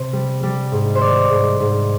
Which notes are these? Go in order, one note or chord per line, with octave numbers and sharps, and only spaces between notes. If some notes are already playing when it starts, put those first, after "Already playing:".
Already playing: C3 C5
G3
G3
G#2
C5
D#3 D5
G#2
G#2